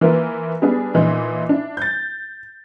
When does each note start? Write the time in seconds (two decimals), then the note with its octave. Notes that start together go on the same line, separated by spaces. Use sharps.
0.01 E3 A#3 E4 F4 A#4 B4
0.62 G3 B3 D4 G#4
0.94 A#2 E3 D#4
1.49 D4 E4
1.77 G6 A6